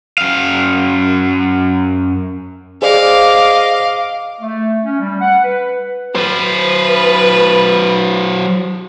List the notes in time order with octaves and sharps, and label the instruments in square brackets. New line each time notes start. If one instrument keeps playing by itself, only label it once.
[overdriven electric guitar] F#2 F5
[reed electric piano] G#4 C5 D5 [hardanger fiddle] D#5 D6 [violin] F5
[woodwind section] A3
C#4
G3
F#5
B4
[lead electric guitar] F#3 C5 [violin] B4